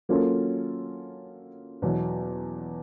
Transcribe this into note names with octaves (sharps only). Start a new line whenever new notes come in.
F#3 A#3 C#4 F4 A4
E2 B2 F#3